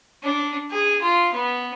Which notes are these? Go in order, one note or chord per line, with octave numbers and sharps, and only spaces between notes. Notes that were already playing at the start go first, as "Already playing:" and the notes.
D4
G#4
F4
B3